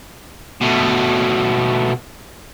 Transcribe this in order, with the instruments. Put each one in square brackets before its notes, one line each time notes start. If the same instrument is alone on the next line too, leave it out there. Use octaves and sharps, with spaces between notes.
[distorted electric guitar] B2 A3